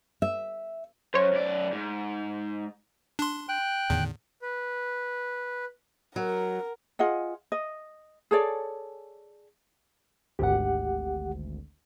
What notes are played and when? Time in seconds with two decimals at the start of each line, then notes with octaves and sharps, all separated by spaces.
0.22 E5
1.14 F#2 C5 C#5
1.33 F#2 D5
1.72 G#2
3.19 D4 C6
3.49 G5 F#6
3.90 E2 A2 D3 D#3
4.42 B4
6.16 F#3 A#4
6.99 F4 G#4 D#5 F#5
7.52 D#5
8.31 G#4 A4 C#5 D5
10.39 G#1 D2 G4 F#5